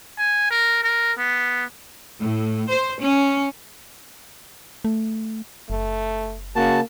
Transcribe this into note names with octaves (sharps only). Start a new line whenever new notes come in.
G#5
A#4
A#4
B3
A2
C5
C#4
A3
F#1 A3
C#3 A#3 F#4 A5